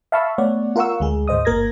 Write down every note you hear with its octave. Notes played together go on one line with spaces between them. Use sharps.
E5 F5 A5 B5 C#6 E6
A3 B3 C#5 D5 F#5
F4 A#4 F5 F#5 C#6 E6
D2 G#3 G#4
D2 G#2 C5 D#5 D#6
G1 A#3 A#4 G#6 A#6